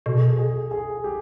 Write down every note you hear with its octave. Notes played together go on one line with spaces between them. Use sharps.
B2 A4
G#4
A4
G#4
G#4
G4